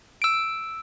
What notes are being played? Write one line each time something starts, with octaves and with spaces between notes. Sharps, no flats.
E6 D7